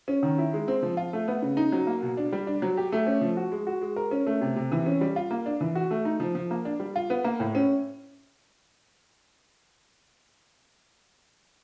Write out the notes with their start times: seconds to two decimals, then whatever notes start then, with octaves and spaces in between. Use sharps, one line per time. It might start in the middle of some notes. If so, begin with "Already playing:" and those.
0.08 C#4
0.23 D#3
0.38 E4
0.53 G#3
0.68 C4
0.83 F3
0.97 F4
1.13 A3
1.28 B3
1.42 C#3
1.57 D#4
1.72 F#3
1.87 A#3
2.02 B2
2.17 D4
2.32 G3
2.47 D4
2.62 F#3
2.77 G4
2.92 A3
3.07 C#4
3.21 F3
3.37 F#4
3.52 G#3
3.67 F#4
3.81 G#3
3.96 A#4
4.11 C#4
4.26 A3
4.41 C3
4.56 C3
4.72 E3
4.86 C#4
5.01 G3
5.16 F4
5.31 A#3
5.46 D4
5.61 E3
5.75 F#4
5.91 A3
6.05 D#4
6.20 F3
6.35 F3
6.51 A#3
6.65 D4
6.80 G3
6.96 F4
7.10 B3
7.24 A#3
7.40 A2
7.55 C#4